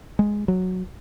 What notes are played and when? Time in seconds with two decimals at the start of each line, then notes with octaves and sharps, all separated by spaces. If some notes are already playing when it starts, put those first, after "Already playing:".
0.19 G#3
0.48 F#3